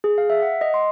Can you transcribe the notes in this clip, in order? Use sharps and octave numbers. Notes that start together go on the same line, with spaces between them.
G#4
F5
E5
F#5
D#5
C6